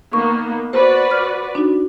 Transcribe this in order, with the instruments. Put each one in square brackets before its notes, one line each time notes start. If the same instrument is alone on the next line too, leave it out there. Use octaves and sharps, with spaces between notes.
[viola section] D#3 A#3 B3 [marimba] C#6
[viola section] F#4 B4 D5 [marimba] C5
[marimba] F6
D4 D#4 F#4